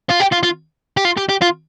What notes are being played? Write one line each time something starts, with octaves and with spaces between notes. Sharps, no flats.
F4
G4
F4
F4
G4
F4
G4
G4
F4